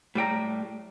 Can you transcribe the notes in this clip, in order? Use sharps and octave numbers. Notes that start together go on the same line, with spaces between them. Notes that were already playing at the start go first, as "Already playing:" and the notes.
A2 G3 G5 A#5